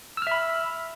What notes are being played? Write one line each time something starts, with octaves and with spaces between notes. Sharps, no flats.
E5 B5 E6 F6